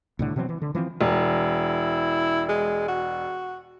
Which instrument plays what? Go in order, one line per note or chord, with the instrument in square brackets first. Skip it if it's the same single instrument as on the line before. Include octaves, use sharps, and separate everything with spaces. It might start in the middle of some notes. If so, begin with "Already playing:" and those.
[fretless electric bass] C2 A2 D3
B2 E3 F#3 C4
E3
D3
E3 F3 A#3 C4
[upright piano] E1 [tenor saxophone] E4
[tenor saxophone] G#3
F#4